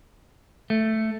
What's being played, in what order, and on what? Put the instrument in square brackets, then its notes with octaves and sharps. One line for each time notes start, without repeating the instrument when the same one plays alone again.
[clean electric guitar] A3